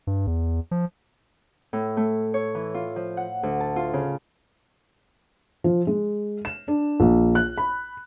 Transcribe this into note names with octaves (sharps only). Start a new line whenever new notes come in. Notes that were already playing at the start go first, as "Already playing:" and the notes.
G2
E2
F3
A2
A3
C#5
E3
F4
F3
F#5
D2
A5
F4
C#3
F3
G#3
E7
D4
A#1
F#6
B5